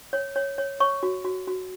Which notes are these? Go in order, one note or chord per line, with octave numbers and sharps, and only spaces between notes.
C#5
C#5
C#5
C#5 C#6
F#4
F#4
F#4